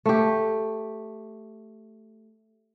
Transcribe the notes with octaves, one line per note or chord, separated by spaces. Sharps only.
A3 G4